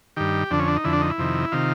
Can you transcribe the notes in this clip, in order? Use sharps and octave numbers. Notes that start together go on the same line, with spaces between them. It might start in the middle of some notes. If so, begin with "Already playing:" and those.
G2 D#3 G4
F2 D3 D4
C#4
D4
D#4
F2 D3 E4
D4
D#4
E4
F2 C3 D#3
C3 D#3 F4